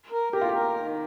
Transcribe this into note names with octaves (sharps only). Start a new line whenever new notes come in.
A#4
G4 A#4
F4
G4 A#4
D#3